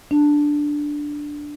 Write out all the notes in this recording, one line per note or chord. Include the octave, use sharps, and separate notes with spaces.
D4